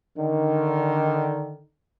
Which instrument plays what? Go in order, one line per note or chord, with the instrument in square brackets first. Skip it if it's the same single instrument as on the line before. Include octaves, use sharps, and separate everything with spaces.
[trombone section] D3 D#3